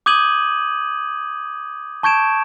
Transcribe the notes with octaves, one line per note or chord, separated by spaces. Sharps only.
D6 D#6 G6 G#6 D#7 F#7
A5 C#6 G6 G#6 D7 E7